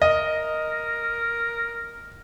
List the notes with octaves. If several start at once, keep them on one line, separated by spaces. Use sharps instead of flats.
A#4 D#5